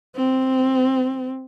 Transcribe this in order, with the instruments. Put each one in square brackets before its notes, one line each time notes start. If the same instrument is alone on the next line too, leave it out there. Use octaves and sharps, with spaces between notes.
[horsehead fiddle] C4